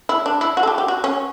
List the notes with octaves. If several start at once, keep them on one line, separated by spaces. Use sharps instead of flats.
E4
D4
E4
F#4
A4
G4
G4
F#4
C#4